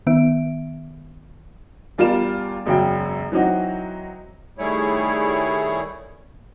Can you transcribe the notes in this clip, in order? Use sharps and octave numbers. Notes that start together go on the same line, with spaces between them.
D#3 B3 E5 D7
E2 G3 F4 A#4 D5 E7
E1 F#2 C#3 F#3 G5
E3 F#3 C4 D#4 F#4
D#3 G3 A3 E4 G#4 C#5